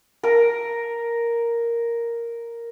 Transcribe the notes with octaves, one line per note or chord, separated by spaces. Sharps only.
A#4 A#5